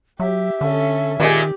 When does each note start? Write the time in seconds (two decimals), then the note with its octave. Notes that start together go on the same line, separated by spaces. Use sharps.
0.20 F#3 G4 E5
0.61 D3 C#4 A4
1.20 A#2 D#3 G#3 G4